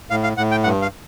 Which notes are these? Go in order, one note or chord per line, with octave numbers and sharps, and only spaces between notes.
A2 F5
F5
A2 F#5
G5
G2 F#5
F5